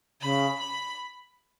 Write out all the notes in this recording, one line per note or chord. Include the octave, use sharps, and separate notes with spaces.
C#3 B5
B5